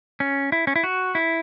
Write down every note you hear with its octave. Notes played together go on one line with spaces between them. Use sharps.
C#4
E4
C#4
E4
F#4
E4